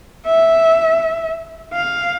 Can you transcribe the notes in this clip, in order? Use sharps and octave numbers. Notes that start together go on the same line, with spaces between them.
E5
F5